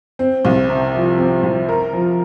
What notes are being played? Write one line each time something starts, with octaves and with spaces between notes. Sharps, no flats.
C4
C2
C3
F3
C4
C2
A#4
F3